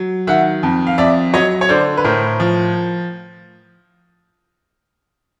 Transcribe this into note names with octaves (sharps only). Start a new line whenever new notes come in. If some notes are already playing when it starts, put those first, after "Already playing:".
Already playing: F#3
D#3 E5 F#5
F2
F5
F2 D5 E5
F#3 C#5 D#5
C#5
D3 C5 D5
B4
A2 A#4 C5
F3